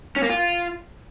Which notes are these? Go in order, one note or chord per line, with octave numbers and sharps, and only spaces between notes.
C#4
A#3
F4